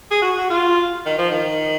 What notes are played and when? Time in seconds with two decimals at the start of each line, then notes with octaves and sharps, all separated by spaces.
0.11 G#4
0.22 F#4
0.38 F#4
0.50 F4
1.06 D#3
1.18 F3
1.31 D#3